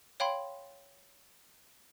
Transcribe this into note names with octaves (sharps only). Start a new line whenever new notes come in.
C#5 F5 G5 B5 C6